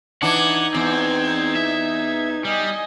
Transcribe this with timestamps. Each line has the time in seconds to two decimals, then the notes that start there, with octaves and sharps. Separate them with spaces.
0.23 E3 D4 D#4 F#5 G#6
0.74 E2 C4
1.55 E5
2.45 G3 D#5 G#5